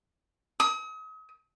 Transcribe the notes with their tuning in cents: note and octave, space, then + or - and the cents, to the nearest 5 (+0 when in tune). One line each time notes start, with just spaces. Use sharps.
D#6 +40